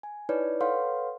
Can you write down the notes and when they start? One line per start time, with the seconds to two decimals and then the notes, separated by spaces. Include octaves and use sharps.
0.03 G#5
0.29 D#4 E4 B4 C#5 D5
0.61 A4 B4 C#5 F5 F#5 C6